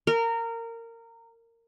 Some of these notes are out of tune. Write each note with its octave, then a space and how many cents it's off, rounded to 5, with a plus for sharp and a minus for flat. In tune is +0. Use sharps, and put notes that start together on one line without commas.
A#4 -20